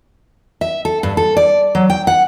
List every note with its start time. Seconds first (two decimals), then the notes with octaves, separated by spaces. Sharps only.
0.61 E5
0.85 A4
1.03 G2
1.17 A4
1.37 D5
1.75 F#3
1.90 G5
2.07 F#5